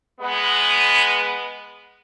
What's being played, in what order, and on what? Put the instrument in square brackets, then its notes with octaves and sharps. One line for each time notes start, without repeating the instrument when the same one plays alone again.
[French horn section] G#3 B3